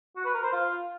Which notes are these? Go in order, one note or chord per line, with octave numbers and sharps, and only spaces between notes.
F#4
B4
A#4
C5
F4